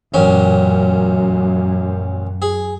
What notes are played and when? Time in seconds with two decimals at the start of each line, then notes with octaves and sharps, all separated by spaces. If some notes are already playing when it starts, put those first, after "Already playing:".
0.14 A1 F#2 A#2 C#4
2.42 G#4